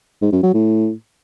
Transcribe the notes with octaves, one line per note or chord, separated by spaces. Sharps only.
G#2
F#2
F#3
A2